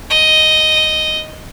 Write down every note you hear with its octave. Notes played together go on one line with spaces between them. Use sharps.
D#5